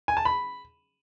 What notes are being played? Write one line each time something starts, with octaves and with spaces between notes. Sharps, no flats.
G#5
A5
B5